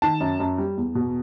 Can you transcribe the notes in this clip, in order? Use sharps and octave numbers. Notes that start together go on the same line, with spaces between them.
D#3 A5
F#2
F#2
G3
E2
B2